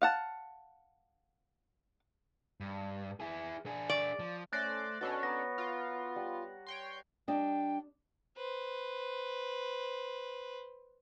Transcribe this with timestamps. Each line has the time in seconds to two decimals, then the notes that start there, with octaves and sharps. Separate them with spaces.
0.02 F5 F#5 A5
2.60 G2
3.20 E4 G#4
3.66 D4 G#4
3.90 D5
4.19 F3
4.53 A3 C#4 C5 D5 F#6 A6 A#6
5.01 B2 C#4 D4 F#4 A4 C#5
5.23 B3 B4 A#5 A#6
5.58 F4
6.16 G3 F#5
6.67 C#5 G5 C6
7.28 G3 D4 D#5 G5
8.37 B4 C5